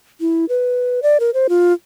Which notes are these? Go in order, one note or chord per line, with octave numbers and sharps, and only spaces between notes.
E4
B4
D5
A#4
C5
F4